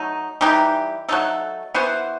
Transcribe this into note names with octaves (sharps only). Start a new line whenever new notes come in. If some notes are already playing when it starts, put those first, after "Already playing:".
Already playing: F#3 A3 D#4
E3 G3 D#4 G4
F#3 A3 D#4 A4
E3 B3 F#4 C5